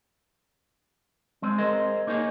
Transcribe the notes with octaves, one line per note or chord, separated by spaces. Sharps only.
G#3 C4
G#4 A#4 C5 D#5
A#3 D#4 G#4 C#5